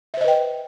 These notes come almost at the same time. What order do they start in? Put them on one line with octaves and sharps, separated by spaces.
E5 C5 D#5 B4 G5